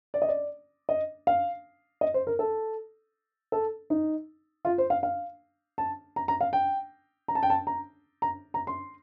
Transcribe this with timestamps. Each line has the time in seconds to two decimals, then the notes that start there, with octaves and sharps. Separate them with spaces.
0.14 D5
0.22 D#5
0.29 D5
0.89 D#5
1.27 F5
2.01 D#5
2.14 C5
2.27 A#4
2.39 A4
3.52 A4
3.90 D#4
4.65 F4
4.78 C5
4.90 F5
5.03 F5
5.78 A5
6.16 A#5
6.28 A#5
6.41 F5
6.53 G5
7.28 A#5
7.35 A5
7.43 G5
7.50 A5
7.67 A#5
8.22 A#5
8.54 A#5
8.67 C6